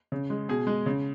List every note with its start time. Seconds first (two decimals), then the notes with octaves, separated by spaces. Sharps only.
0.12 C#3
0.30 G#3
0.49 B2 G#4
0.67 G#3
0.86 C#3